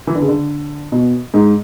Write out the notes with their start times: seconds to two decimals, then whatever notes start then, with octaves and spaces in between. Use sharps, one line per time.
0.07 E3
0.15 D3
0.22 C#3
0.28 D3
0.92 B2
1.34 G#2